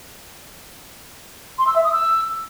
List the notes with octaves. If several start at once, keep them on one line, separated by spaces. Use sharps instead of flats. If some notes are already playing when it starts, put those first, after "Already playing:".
C6
E6
E5
D#6
E6